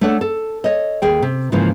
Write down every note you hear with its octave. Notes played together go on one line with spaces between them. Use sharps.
A3 D4 A4 C#5 F#5
A4
C#5 D#5
D#2 G#4 G5
C3
G#2 C#3 E3 F3 A#3